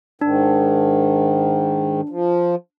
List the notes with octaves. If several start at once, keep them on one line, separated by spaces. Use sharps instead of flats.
G#2 D#3 D4
F3